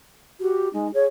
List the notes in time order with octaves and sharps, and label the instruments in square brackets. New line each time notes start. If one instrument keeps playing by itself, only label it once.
[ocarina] F#4 [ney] G4
[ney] G#3 [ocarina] D#4
[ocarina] G#4 [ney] C#5